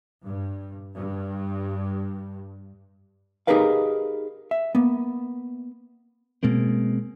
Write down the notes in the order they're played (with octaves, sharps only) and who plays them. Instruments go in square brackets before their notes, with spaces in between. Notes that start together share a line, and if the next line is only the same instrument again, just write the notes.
[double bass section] G2
G2
[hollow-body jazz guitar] D#4 G4 G#4 A#4 B4 F5
E5
A#3 B3
[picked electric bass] B2 G#3 A#3 C4